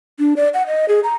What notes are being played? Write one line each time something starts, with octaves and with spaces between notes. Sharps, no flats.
D4
D5
F#5
D#5
G#4
A#5